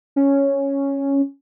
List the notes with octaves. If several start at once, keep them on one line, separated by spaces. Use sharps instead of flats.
C#4